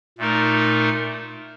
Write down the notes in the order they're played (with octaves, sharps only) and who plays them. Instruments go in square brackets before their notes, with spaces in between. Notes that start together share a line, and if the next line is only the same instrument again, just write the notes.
[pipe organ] A#2 A3 D#4 A#4